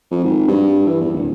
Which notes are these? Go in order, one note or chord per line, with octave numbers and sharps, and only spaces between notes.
F2
G#1
G2
E3
E2
D1